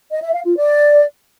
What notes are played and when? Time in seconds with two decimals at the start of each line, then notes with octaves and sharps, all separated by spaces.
0.10 D#5
0.21 E5
0.33 F5
0.44 F4
0.56 D5